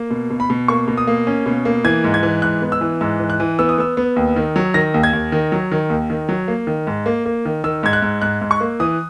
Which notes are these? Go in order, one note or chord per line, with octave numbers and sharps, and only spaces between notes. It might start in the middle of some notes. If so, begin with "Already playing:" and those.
Already playing: A#3
B2
B2
B5
B2
A#3 C#6
B2
D#6
A#3
C#4
B2
A#3
E3 G#6
G#2
G#6
E3
G#2 F#6
B3
E6
E3
G#2 E6
E3
F#6
E3
B3 E6
D#6
B3 E6
B3
D#2
D#3
F#3
D#3 A#6
D#2
G#6
D#2
D#3
F#3
D#3
D#2
D#3
F#3
A#3
D#3
G#2
A#3
A#3
D#3
D#3 E6
G#2 G#6
F#6
G#2
G#2 F#6
G#2
C#6
A#3
E3 D#6